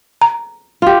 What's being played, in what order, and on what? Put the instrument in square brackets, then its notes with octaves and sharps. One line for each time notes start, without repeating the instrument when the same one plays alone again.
[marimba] A#5
[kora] F4 G4